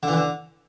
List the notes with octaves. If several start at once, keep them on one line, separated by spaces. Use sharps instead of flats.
D3
E3
D3